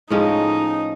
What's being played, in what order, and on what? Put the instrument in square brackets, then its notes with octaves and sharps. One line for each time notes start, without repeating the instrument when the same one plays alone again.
[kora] A2 F3 G#3 C#4 [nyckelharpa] D#4